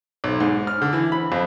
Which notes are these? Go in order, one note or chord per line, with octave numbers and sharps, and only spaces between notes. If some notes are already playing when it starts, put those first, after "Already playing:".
B1
G#2
F6
D3
E3
B5
F2